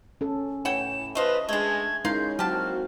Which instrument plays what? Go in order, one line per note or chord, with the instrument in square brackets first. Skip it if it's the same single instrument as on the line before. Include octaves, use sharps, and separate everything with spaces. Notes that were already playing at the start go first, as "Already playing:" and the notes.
[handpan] C#4 A4
[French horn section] A2 [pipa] E3 F#5 G5 [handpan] C#5 [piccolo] E7
[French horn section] C#3 F4 B4 [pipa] A3 C5 F5 [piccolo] D#5
[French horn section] G#3 [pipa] A3 D4 [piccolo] G#6
[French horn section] C#3 [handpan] G#3 D#4 E4 [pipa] A#4 F5 C6 [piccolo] G6
[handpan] F#3 [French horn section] A#3 C4 F#4 [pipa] G4 A5 [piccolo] F6